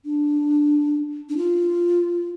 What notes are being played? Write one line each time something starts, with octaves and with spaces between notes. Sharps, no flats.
D4
D4
F4